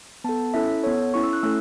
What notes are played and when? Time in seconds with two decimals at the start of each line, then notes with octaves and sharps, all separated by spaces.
0.24 B3 A5
0.29 A4
0.54 C#4 E4 A4 E5
0.83 B3 A4 C#5
1.14 C#4 E4 A4 C#6
1.23 E6
1.33 F#6
1.43 A3 C#4 E4 A4 E6